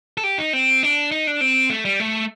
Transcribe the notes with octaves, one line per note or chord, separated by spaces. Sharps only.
A4
G4
D#4
C4
D4
D#4
D4
C4
A3
G3
A3